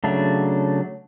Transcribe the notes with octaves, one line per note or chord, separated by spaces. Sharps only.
C#3 F#3 A3 D4